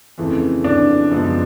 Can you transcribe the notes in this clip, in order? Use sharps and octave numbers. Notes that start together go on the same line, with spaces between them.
F2 C#3 E3 A3
D4
F#2 C#3 F3 G#3 B3